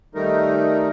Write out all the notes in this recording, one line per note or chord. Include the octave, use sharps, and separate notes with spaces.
D#3 G3 A3 D#4 A#4